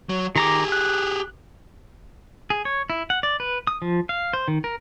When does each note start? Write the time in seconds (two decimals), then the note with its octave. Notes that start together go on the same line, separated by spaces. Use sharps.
0.09 F#3
0.36 D#3 G4 G#4 A#5 D6
0.72 F#6
2.50 G#4
2.65 C#5
2.90 E4
3.10 F#5
3.23 D5
3.40 B4
3.67 D#6
3.82 F3
4.09 F5
4.33 C5
4.48 D#3
4.64 A#4